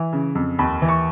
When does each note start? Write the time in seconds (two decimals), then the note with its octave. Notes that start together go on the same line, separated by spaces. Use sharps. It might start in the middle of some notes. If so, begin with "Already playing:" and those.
Already playing: E3
0.13 C#3
0.35 F2
0.59 D#2 B5
0.82 E3
0.89 C#6